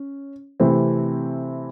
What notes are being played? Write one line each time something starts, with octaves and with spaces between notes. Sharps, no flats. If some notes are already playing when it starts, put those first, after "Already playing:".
Already playing: C#4
C3 E3 A3 C4 E4